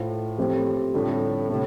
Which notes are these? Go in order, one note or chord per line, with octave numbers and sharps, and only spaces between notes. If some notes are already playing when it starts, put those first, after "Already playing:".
Already playing: A2 A3 F4 C5 F5
F3 A3 C4 G4 C5
A2 D3 G3 C4 F4
A2 C3 A3